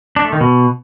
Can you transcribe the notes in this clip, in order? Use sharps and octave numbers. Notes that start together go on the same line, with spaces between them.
D4
A3
D#3
B2